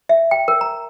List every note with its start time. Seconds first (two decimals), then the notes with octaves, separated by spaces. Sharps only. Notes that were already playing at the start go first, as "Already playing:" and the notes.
0.09 E5
0.31 G5
0.48 A#4
0.61 A#5